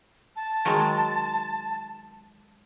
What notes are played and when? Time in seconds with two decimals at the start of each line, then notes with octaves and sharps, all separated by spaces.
0.36 A5
0.65 D#3 F#3 G#3